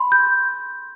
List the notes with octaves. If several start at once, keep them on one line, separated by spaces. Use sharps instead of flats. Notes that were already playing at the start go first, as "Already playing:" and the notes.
Already playing: B5 C6
G6